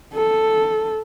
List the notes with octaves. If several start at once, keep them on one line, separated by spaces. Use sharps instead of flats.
A4